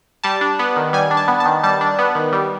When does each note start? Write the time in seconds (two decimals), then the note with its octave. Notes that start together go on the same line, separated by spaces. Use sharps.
0.24 G3 A5
0.41 D4
0.59 B3
0.76 D#3
0.93 G3 G#5
1.11 D4
1.17 A5
1.28 B3
1.40 A5
1.46 D#3
1.63 G3 A5
1.81 D4
1.99 B3
2.15 D#3
2.32 G3